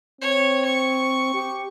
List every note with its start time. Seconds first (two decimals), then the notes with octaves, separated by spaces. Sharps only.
0.21 C4 C#5
0.65 C#6
1.34 G4